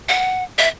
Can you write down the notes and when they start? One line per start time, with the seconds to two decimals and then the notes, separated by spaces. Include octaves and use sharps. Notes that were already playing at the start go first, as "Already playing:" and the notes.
0.09 F#5
0.59 E5